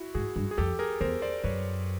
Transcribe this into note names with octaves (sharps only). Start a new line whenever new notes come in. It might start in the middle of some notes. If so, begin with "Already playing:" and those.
Already playing: E4 F#4
G#2 F#4 G#4
G2
G#4
F2 G4 A4
G#4 A#4
E2 A#4 C5
C5 D5
F#2 B4 C#5